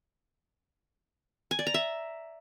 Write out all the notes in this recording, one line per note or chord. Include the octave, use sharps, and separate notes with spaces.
G#5
D5
A#5
E5